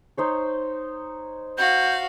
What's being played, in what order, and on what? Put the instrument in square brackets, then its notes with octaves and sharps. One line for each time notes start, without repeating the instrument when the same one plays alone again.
[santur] D#4 C5 C#5
[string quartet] F#4 F5 [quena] G6